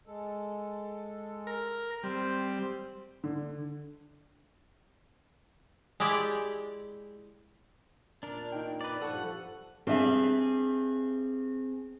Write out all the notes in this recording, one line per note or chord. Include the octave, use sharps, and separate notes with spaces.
G#3 A4
A#4
G3 C4 C5
D3
G#3 E4 G4 D5
A#2 D4 A#4
D#4 G5
B4 D5
G2 F3 A4 F#5 A5 C#6
G2 C4 G#4 E5